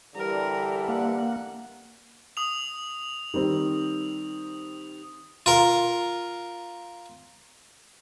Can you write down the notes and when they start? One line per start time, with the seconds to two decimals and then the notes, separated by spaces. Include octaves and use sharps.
0.15 D3 E3 G3 A#4
0.88 A#3 F#5
2.37 D#6 F7
3.34 D#3 G3 C4
5.46 F4 A#4